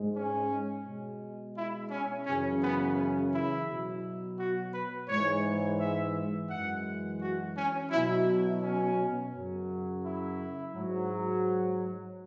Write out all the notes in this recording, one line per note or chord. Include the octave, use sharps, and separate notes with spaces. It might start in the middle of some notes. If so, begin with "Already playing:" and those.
Already playing: G#2 G#3
C#4
B2 G#3
E4
C#4
F#2 C#3 E3 C#4
B3
C#4
E4
B2 F#3
F#4
B4
G#2 E3 G#3 C#5
E5
F#2 E3 G#3 F#5
F#4
C#4
B2 F#3 E4
C#4
F#2 C#3 F#3
E4
G#2 F#3